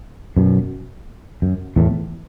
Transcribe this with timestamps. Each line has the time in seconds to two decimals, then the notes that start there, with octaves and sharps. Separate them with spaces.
0.37 F#2 B2
1.42 F#2
1.76 E2 A2